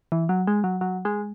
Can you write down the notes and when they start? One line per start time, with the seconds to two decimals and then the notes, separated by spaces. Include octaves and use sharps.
0.12 E3
0.29 F#3
0.47 G#3
0.64 F#3
0.81 F#3
1.05 G#3